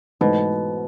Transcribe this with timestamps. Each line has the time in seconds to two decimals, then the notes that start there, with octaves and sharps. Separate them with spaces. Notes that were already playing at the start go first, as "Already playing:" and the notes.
0.21 G#2 B2 E3 A3